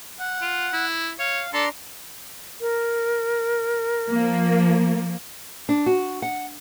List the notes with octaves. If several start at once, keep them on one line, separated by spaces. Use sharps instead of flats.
F#5
F4
E4
C#5 F5
D4 A4 A#5 C6
A#4
F3 A#3
D4
F#4
F#5